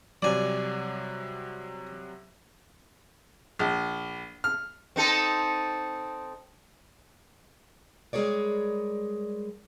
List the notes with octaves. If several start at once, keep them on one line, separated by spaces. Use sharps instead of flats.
C3 F#3 G3 D5 G#5
A#1
F6
C4 D#4 A4
G3 G#3 G#4 A#4 C#5 D5